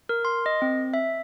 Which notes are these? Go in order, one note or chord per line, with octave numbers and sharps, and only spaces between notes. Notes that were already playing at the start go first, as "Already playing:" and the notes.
A#4
C6
D#5
C4
E5